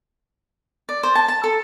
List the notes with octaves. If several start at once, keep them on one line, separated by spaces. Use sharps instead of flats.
D5
C5
A5
A5
A4